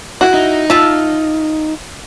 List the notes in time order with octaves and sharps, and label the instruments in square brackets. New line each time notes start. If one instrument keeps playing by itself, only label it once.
[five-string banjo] E4 F#4
[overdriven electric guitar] D#4
[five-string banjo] F4 [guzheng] E5 A5